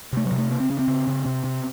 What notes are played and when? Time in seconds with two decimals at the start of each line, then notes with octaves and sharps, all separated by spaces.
0.13 C3 A3
0.26 F#3
0.32 C3
0.38 A3
0.50 C#3 A#3
0.60 C4
0.70 C#3 C#4
0.79 C4
0.88 C#3
1.07 C#3
1.26 C3
1.44 C3